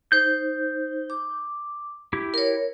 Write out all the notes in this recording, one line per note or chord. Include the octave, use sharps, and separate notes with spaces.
D#4 C5 G6
D6
E4 G4
A#4 C#5